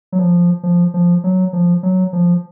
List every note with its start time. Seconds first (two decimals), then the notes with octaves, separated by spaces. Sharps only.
0.12 F#3
0.19 F3
0.63 F3
0.94 F3
1.24 F#3
1.53 F3
1.83 F#3
2.13 F3